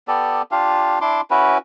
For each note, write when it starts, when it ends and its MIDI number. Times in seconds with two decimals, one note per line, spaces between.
0.08 0.42 59
0.08 0.42 67
0.08 0.42 69
0.08 0.42 74
0.51 0.99 62
0.51 0.99 65
0.51 0.99 67
0.51 0.99 77
1.01 1.21 62
1.01 1.21 64
1.01 1.21 84
1.01 1.21 86
1.31 1.58 61
1.31 1.58 64
1.31 1.58 66
1.31 1.58 71